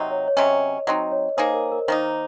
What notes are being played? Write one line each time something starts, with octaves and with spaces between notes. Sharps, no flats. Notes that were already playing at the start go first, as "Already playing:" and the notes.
Already playing: C3 F#3 C4 D#4 D#5
C#5
C#5
C3 F#3 C#4 D#5
F#3 C4 D#4 D#5
C#5
A#3 D#4 G#4 C5
A#4
A#4
D#3 A#3 D#4 C5